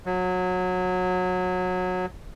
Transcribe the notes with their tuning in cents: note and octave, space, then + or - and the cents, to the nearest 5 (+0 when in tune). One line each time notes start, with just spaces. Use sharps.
F#3 -20